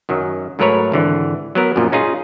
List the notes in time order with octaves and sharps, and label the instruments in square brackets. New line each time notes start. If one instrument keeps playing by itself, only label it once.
[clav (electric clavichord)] F#2 D#3 F#3
G#2 F#3 A3 A#4 B4 C#5
G#1 D3 E3
F#3 B3 A#4
F#2 A#2 F3
C#4 D#4 F4 G#4